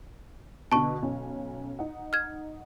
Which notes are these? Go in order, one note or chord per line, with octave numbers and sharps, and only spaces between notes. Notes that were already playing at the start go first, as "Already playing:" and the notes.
B2 D3 A5 C#6
B1 C#4
D#4 F#5
F6 G#6